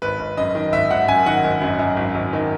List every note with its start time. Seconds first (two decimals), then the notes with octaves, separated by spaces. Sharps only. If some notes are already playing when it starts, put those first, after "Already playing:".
0.02 G#1 B4
0.19 G#1
0.37 F#2 D#5
0.55 D#3
0.72 G#1 E5
0.90 G#1 F#5
1.08 F#2 G#5
1.26 D#3 F#5
1.44 G#1
1.61 F#2
1.79 F#2
1.96 G#1
2.15 G#1
2.33 D#3